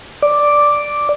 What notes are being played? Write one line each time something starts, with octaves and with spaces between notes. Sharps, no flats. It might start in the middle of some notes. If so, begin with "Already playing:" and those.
D5